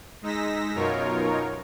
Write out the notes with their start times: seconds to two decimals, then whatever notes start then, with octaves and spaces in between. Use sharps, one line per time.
0.22 G#3 D#4 E6 A#6 B6
0.74 F#2 B2 D#4 F4 A#4 C#5